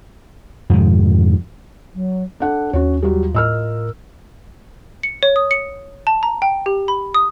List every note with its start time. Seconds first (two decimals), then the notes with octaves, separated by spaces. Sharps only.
0.70 F2 G#2 C3 D#3
1.94 F#3
2.40 D4 A4 F#5
2.73 D#2 C#4 F#4 C#5
3.03 F#3 G3 F4
3.34 A2 A#4 D#5 E6 F6
5.03 C#7
5.23 C#5
5.36 D#6
5.51 C#7
6.07 A5
6.23 A#5
6.42 G5
6.66 G4
6.88 B5
7.14 D#6